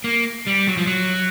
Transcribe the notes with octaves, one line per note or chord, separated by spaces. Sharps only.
A#3
G3
F#3
F3
F#3